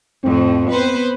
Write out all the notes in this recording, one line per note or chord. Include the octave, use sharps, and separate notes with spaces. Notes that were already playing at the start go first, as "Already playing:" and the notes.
F2 A2 C4
B3 B4 C5